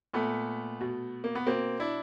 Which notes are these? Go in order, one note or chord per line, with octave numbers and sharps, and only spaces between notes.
A#2 A3 B3
B2
A#3
B3
B2 A#3 C4
D4 E4